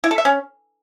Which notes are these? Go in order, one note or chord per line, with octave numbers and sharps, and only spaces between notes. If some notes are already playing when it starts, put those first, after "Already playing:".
E4
A4
E5
C#4